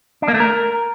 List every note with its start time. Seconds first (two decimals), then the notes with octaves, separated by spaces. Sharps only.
0.22 D4
0.28 A#3
0.34 A3
0.40 A#4